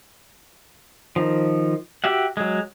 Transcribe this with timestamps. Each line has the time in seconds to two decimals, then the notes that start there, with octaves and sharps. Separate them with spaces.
1.16 D#3 F3
2.04 F#4 G4 E5 F#5
2.37 F#3 G#3